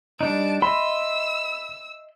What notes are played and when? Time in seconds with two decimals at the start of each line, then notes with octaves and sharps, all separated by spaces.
0.21 G3 D4 D#4 A5 D7
0.62 D#5 E5 B5 C6 E6